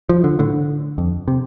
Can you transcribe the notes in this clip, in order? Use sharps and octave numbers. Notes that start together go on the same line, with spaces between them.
F3
D3
A2 D3
F2
C3